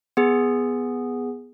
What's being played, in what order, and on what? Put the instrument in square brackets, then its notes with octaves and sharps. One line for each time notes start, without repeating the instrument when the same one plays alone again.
[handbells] B3 G#4